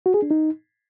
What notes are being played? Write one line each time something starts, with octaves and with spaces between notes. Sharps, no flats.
F#4
G#4
D4
D#4